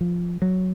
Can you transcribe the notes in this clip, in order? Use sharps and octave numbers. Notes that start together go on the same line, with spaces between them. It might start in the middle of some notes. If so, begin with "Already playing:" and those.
F3
F#3